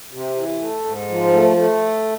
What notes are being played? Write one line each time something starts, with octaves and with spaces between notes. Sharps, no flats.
C3
E3
A3
G#2
F3
A3
A3